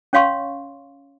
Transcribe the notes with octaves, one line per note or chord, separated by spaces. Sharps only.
C#4 C#5 F5 C6 C#6